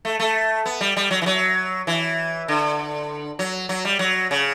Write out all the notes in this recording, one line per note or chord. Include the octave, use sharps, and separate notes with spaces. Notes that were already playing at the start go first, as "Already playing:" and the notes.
A3
A3
B3
G3
G3
F#3
E3
F#3
E3
D3
F#3
F#3
G3
F#3
C#3